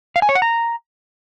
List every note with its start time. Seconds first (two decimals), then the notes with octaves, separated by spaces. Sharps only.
0.16 F5
0.22 G#5
0.29 C#5
0.35 F#5
0.42 A#5